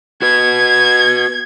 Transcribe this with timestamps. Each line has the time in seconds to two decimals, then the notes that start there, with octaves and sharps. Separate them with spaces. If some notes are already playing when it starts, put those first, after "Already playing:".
0.22 F#4 B4 G#6